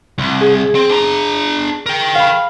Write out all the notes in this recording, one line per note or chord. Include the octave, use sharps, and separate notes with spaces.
C2
G#4
C4 C5
D4 A#5
A#4 G5
F5 B5